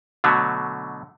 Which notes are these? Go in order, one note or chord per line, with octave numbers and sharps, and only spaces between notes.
B2 D3 F#3 A3